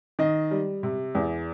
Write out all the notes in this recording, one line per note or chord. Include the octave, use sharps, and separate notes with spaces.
D#3 D#5
G3
C3
E2